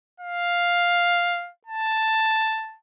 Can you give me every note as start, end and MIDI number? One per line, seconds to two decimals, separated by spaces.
0.21 1.50 77
1.67 2.77 81